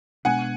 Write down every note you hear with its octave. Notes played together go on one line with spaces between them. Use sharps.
B2 G#3 B3 D4 F#5 G#5